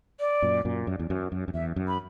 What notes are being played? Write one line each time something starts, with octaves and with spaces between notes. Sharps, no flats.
D5
F#2 A#2
F#2 A#2
F#2
E2
F#2
F#2
F#2
E2 E5
F#2
B5